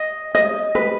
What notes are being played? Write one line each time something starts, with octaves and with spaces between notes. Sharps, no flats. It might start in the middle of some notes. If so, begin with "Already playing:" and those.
Already playing: D#5
D#5
B4